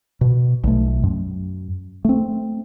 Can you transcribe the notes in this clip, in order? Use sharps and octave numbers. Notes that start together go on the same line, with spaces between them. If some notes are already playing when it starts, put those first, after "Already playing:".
B2
B1 B2 A3
F#2
A3 C4